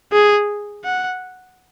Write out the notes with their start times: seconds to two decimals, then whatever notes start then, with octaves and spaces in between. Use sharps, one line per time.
0.13 G#4
0.85 F#5